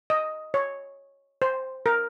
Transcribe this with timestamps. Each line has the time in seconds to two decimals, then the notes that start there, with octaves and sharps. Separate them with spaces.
0.10 D#5
0.54 C#5
1.42 C5
1.86 A#4